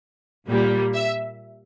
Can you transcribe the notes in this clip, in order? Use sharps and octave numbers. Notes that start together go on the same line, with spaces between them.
A#2 G3 A#3
E5